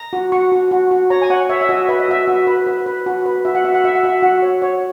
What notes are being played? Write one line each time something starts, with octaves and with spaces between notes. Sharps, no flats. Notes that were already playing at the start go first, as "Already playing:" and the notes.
Already playing: A#5
F#4
F#4 C#6
F#4
F#4
F#4
C#5 A#5
G#5
C#5 F#5
C#5 E5
E5
F#4 D#5
B4 E5
D#5
F#4 E5
F#4
B4
B4
B4
F#4
B4
F#4 E5
F#5
F#4 E5
F#5
F#4 E5
F#5
F#4 E5
F#4 F#5
C#5
C#5